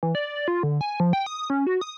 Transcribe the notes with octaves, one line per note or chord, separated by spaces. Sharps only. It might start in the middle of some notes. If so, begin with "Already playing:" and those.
E3
D5
F4
D3
G#5
F3
G5
D#6
C#4
F#4
D#6